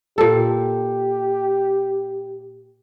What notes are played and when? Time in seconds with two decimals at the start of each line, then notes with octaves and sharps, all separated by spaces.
0.18 A#2 G4 A4